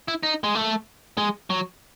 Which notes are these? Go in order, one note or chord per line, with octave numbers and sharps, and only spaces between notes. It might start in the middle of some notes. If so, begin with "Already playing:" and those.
E4
D#4
G#3
A3
G#3
F#3